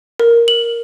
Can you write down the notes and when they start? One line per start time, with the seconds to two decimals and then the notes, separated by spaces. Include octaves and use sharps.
0.20 A#4
0.48 F#7